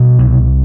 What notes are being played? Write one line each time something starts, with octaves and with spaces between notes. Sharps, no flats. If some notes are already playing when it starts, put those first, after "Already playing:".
Already playing: B2 G3 B3
C2